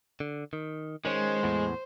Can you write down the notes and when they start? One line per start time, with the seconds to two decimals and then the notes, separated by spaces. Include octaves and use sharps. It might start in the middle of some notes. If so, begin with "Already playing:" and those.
0.20 D3
0.53 D#3
1.05 D#3 G#3 C#4 C5
1.43 E2 A2 B3